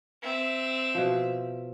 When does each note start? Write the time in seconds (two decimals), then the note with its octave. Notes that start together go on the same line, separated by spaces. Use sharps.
0.23 C4 E5
0.95 B2 F3